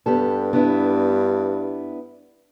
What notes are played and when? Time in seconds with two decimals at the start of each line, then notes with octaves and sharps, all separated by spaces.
0.06 G2 B3 G4 A4
0.53 B3 D4 E4